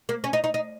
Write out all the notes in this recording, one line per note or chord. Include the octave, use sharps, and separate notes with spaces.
A#3
C#4
D#4
D#4
D#4